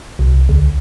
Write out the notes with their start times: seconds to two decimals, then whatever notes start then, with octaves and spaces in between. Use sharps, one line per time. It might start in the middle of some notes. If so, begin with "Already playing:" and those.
0.19 C2
0.49 D2